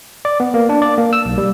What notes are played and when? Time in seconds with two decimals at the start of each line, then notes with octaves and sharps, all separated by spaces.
0.25 D5
0.40 B3
0.54 A#3
0.69 D4
0.82 D5
0.98 A#3
1.13 E6
1.25 B1
1.38 G3